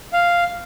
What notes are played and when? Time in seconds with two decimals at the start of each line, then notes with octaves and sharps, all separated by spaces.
0.13 F5